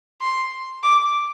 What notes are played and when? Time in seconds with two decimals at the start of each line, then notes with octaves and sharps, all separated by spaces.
0.21 C6
0.83 D6